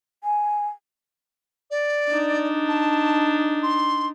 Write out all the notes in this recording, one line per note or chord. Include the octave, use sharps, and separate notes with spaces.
G#5
D5
D4 D#4
A5
C6